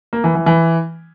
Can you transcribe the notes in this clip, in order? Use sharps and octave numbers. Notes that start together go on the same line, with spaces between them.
A#3
E3
E3
E3